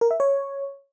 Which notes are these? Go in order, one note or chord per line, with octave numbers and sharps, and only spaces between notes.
A#4
E5
C#5